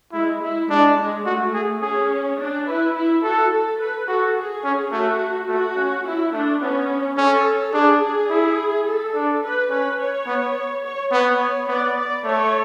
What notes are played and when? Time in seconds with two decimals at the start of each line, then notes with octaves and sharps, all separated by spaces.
0.13 G#3 E4
0.42 E4
0.70 G#3 D4
0.98 G#3
1.26 A3 F#4
1.54 G#4
1.82 C#4 G#4
2.39 D4
2.67 E4 B4
2.95 E4
3.23 F#4 A4
3.52 A4
3.79 B4
4.07 F#4 A4
4.36 G#4
4.64 C#4
4.92 A3 F#4
5.48 A3 F#4
5.77 C#4
6.05 E4
6.32 A3 D4
6.61 B3 C#4
7.17 C#4 A4
7.73 D4 G#4
8.02 G#4
8.30 E4
8.86 A4
9.15 D4
9.43 B4
9.70 C#4 B4
9.99 C#5
10.27 B3
10.83 C#5
11.12 B3 C#5
11.68 B3 D5
11.96 D5
12.24 A3 C#5